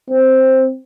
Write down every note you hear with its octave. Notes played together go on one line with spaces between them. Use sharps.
C4